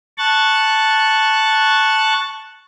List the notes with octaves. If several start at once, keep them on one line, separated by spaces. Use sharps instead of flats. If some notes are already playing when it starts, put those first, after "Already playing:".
A5 C#6 F#6 A6